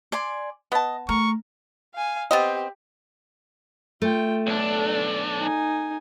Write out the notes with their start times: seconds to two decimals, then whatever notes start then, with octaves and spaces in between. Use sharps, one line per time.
0.12 D5 G#5 C6
0.72 B3 D#5 A5
1.09 A3 A#4 C#6
1.94 F5 G#5
2.31 B3 C4 G4 D#5
4.02 A3 F4 G5
4.47 B1 D4 A4 D5
5.41 D#4 G#5